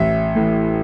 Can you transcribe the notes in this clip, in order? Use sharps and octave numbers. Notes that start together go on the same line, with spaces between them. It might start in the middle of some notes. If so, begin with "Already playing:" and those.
Already playing: A1 E5
A2 E3